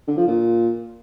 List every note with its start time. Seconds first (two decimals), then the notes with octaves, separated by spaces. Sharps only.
0.07 D3
0.17 F3
0.27 A#2